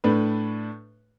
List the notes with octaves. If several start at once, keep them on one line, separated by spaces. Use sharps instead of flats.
A2 A3 D4 B4